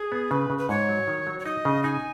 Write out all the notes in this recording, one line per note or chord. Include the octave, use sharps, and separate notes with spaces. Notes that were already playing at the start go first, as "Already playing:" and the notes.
Already playing: G#4
B3
C#3 B4
C#3
B4
G#2 C#5
F#3
D#3
F#3
C#5
D#4 D#5
C#3
D#4 G#5